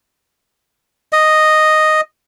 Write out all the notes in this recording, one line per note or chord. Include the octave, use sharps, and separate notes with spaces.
D#5